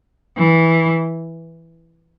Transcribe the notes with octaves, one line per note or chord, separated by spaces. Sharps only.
E3